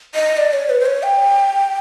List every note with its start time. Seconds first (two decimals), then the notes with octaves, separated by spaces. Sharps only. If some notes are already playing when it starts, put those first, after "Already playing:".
0.15 D#5
0.37 D5
0.53 C#5
0.69 B4
0.80 C5
0.86 C#5
1.03 G5